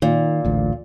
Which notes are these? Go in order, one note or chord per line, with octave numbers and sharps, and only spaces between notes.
A#2 D#3
A1 D2